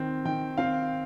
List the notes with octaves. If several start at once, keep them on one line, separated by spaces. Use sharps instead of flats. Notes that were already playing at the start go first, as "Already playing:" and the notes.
Already playing: D#3 C4
D#3 G5
C4 F5